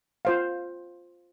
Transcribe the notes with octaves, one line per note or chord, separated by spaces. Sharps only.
F4 C5 F5